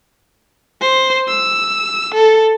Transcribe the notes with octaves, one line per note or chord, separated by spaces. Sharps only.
C5
E6
A4